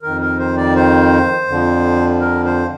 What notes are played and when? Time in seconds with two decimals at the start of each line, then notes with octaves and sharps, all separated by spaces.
0.02 F2 D#3 A#4
0.21 A#4
0.39 C5
0.57 D5
0.75 C5
1.48 F2 D3 F3
2.20 A#4
2.45 C5